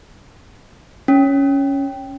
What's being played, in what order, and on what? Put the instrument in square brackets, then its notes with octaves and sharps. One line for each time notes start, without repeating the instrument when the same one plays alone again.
[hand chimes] C#4